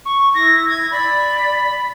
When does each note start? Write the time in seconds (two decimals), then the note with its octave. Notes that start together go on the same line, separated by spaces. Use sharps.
0.05 C#6
0.34 E4 A#6
0.69 G#6
0.91 D5 B5